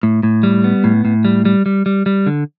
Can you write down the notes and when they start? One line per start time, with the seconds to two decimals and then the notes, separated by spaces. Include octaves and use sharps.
0.03 A2
0.23 A2
0.43 G3
0.64 B3
0.84 A2
1.05 A2
1.25 G3
1.45 G3
1.66 G3
1.86 G3
2.06 G3
2.26 D3